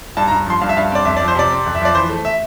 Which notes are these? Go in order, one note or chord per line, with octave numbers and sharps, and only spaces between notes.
G2 A5
A#5
G2
F3 C6
G2 F5
E5
G2 F5
C4 D5
F2 E5
D5
F3
C5
C3 D5
C4
F2
E5
F3 D5
E3 C5
A3
E5